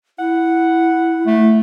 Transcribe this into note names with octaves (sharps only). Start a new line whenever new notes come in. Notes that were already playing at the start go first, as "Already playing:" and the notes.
E4 F#5
A3